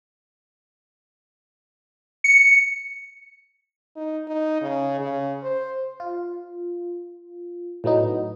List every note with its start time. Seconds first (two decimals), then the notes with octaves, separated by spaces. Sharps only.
2.24 C#7
3.96 D#4
4.28 D#4
4.62 C#3
5.00 C#3
5.43 C5
6.00 F4
7.84 A2 F#3 B3 D#4